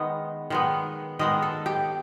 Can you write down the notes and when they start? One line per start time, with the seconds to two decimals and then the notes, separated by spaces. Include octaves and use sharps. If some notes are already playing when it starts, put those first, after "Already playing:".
Already playing: D#3 G#3 B3 D#5
0.50 D#3 G#3 B3
1.19 D#3 G#3 B3 D#5
1.42 A4
1.66 G4